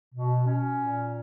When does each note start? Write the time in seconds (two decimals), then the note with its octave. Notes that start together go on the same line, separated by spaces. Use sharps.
0.15 B2
0.46 C#4
0.76 A#2